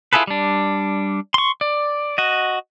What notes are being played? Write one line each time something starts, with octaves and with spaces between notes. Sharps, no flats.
E4 F4 G#4 A4 B4
G3 D4
C6 C#6
D5
F#4 D#5